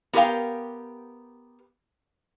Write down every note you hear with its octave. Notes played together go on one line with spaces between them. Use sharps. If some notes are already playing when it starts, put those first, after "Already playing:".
B3 G4 A#4 C5 F5 G5